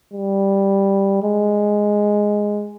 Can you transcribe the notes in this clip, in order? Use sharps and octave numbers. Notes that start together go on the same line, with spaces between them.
G3
G#3